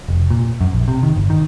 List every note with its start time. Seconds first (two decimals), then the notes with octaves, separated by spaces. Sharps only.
0.08 F1
0.30 A#2
0.61 F#2
0.73 A#1
0.88 C3
1.03 D#3
1.16 G1
1.30 D#3